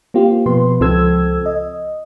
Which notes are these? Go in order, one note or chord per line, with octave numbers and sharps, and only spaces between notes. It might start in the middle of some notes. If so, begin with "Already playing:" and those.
A#3 C4 F4 G4
B2 F3 B4 C6
C#2 F3 C4 A4 E6 G#6
D#5